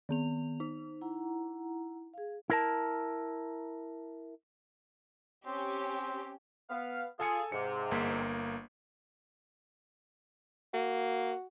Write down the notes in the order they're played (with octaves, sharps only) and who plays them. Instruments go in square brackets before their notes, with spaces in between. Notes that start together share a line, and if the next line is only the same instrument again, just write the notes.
[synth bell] D#3 B3 F7
D#4
[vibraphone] E4 F#5 A#5
G#4 F5
[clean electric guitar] E4 A#4 A5
[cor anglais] C4 [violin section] C#4 G4
[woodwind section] B3 F5
[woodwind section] F4 G#4 [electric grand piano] A4 G#5 C#7
[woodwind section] G#2 C3 [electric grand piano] C#7
[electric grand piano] G1 A#3 B6
[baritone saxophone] A#3 [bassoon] F#4